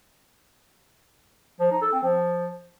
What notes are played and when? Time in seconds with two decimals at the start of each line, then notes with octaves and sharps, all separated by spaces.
1.60 F3
1.71 D#4
1.82 A4
1.92 C4
2.03 F3